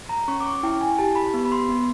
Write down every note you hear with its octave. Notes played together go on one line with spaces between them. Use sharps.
A#5
C#4 C#6
D6
C#6
E4 G5
G#5
G4 A5
B5
B3
B5
C6
B3